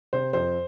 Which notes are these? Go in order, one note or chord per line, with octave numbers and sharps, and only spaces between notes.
C3 C5
F2 C5